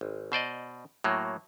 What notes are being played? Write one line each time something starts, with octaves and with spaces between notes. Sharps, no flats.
G#1
B2 C5 D5 D#5
A2 F#3 A#3